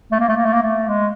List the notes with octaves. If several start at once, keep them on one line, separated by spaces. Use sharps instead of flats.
A3
A#3
A3
A#3
A3
A#3
A3
G#3